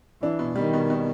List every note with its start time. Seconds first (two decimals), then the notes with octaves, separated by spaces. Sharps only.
0.22 E3 D4
0.39 B2
0.56 D#3 G3
0.73 B2
0.90 B2